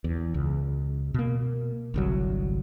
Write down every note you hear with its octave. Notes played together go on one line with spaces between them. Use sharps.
E2
C#2
B2 A#3
G1 C2 F#3